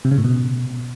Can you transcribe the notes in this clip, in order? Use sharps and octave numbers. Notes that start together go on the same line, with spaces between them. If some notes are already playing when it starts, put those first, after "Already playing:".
C3
C#3
A2
B2